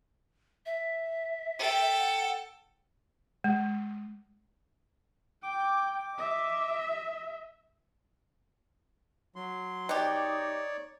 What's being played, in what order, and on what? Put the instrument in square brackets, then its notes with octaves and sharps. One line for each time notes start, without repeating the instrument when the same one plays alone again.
[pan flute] E5
[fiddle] A4 G5
[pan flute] F#5
[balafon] G#3
[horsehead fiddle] G5 [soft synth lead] D6
[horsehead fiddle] D#5 E5
[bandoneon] F#3 C6
[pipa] B2 G4 [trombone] D#4 [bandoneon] C#5 D5